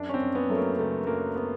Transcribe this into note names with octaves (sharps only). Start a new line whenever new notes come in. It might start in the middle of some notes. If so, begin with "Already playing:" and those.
Already playing: F#2 D4
C#4
C4
F#2
B3
F#3 A3
A#3
C#3 A3
F#2 A#3
B3